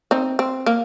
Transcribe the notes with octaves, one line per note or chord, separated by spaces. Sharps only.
C4 D#4
C4
A#3